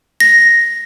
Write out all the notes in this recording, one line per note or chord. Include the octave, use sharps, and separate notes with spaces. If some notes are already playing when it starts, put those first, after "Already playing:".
A#6